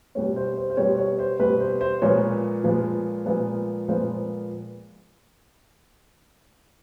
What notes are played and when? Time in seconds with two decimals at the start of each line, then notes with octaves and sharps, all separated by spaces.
0.15 B2 G3 B3 C#5
0.36 C5
0.57 C5
0.70 C5
0.77 B2 G3 B3 C#5
0.98 C#5
1.19 C5
1.40 B2 G3 B3 B4
1.60 C5
1.81 C5
2.02 A#2 F3 G#3 B3 C#5
2.64 A#2 F3 G#3 B3
3.26 A#2 F3 G#3 B3
3.88 A#2 F3 G#3 B3 C5